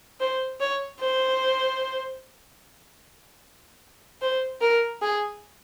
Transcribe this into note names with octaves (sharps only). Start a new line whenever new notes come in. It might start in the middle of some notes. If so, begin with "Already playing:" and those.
C5
C#5
C5
C5
A#4
G#4